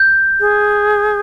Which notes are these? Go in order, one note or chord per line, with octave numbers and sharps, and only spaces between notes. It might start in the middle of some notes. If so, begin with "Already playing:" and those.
Already playing: G6
G#4